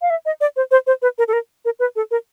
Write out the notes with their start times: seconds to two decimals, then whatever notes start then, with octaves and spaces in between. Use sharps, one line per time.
0.02 F5
0.10 E5
0.26 D#5
0.41 D5
0.56 C5
0.71 C5
0.87 C5
1.02 B4
1.18 A#4
1.28 A4
1.33 A#4
1.65 A#4
1.79 B4
1.96 A4
2.11 A#4